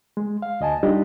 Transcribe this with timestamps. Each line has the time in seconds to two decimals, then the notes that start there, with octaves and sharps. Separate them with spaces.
0.17 G#3
0.42 F5
0.60 D2 D#5 G#5 A5
0.83 G3 D4 D#4 F4 G4 D#5